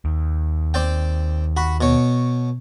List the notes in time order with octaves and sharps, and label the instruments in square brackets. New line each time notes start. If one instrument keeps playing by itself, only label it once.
[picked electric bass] D#2
[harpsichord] C4 D5 G5
F#4 B5
B2 C#5